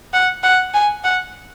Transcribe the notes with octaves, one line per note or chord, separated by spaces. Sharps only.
F#5
F#5
G#5
F#5